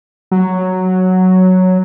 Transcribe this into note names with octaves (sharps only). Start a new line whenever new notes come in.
F#3